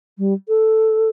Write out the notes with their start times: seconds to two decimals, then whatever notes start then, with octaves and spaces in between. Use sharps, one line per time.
0.18 G3
0.48 A4